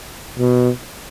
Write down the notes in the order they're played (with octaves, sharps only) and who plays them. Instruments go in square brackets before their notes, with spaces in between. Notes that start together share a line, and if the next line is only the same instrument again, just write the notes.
[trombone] B2